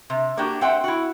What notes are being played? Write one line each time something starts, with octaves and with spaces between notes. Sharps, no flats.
C3
A#3 D4 F#4 G4
C4 C5 E5 F#5 G5
E4 F#4